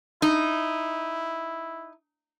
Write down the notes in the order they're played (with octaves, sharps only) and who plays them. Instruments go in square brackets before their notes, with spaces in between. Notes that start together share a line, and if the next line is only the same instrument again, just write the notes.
[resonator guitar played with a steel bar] D#4 [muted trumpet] E4